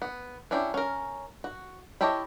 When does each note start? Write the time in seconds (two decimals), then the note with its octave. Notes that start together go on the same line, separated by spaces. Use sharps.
0.02 B3
0.51 C#4 D4 E4 G4
0.74 C#4 A#4
1.44 F#4
2.01 E4 G4 A4 C#5 D#5